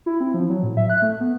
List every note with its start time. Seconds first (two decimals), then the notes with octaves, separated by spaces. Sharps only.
0.06 E4
0.20 C4
0.34 F3
0.49 F#3
0.63 A2
0.77 E5
0.90 F#6
1.02 A3
1.20 B3